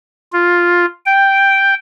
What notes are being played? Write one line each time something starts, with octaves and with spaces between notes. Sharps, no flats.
F4
G5